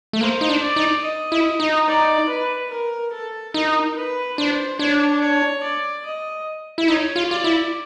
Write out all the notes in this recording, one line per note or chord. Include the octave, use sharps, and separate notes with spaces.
A3
A#3 C5
D#4
D4
D5
D#4
D#5
E4
D#4
D5
B4
A#4
A4
D#4 A#4
B4
D4 C5
D4 C#5
C#5
D5
D#5
E4
D#4 C#5
F4
F4 D5
E4